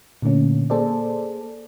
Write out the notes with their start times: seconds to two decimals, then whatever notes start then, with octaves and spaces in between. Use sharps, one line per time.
0.22 A#2 D3 A3 A#3 C#4
0.70 A#3 G#4 A4 C5 D5